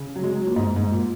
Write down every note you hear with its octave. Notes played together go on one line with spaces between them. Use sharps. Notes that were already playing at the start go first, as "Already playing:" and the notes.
Already playing: C#3
F#3
G#3
F#3
A#2
G#2
G#2
A#2